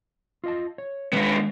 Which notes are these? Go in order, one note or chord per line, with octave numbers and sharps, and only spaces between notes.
F4 D#5 A5
C#5
D3 D#3 G#3 B3